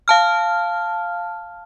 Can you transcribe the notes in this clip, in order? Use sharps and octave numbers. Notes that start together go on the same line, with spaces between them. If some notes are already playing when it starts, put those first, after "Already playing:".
F5 A5 F6